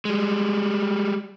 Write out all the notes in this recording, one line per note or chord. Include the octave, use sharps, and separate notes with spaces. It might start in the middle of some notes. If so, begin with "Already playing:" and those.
G3 G#3